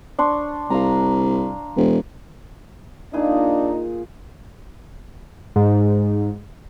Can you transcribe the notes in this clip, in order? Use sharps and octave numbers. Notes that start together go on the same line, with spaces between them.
D4 C6 C#6
C2 F5 A#5
E1
A#2 D4 D#4 G#4
G#2